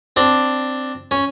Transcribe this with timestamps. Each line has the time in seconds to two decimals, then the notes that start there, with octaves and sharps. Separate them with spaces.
0.16 C4 D4
1.11 C#4